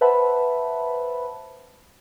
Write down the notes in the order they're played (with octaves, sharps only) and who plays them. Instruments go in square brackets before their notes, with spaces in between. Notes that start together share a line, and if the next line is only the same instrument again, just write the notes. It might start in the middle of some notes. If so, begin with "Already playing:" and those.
[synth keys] B4 C5 E5 F#5 A5 B5